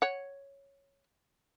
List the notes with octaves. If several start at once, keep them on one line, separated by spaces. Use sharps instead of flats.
C#5 F#5